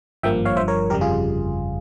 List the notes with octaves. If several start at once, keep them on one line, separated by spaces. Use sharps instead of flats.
G#1 G2 F3 A#3 E5 G5
C#5 F5
G1 G2 F3 C5 E5
A#4 C#5
G1 F2 C#3 G3 G4 A#4
F4 G#4